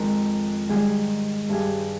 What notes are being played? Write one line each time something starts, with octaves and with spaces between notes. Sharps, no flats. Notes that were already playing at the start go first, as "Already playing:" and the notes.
Already playing: F2 D#3 G#3 A#4
G#2 D#3 G3 G#4
G2 G3 G#4